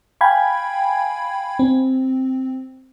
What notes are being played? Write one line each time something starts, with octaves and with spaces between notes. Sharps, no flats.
F5 G5 G#5 B5 G#6
C4